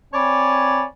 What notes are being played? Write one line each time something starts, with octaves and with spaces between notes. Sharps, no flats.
C4 C#5 D5 G#5 B5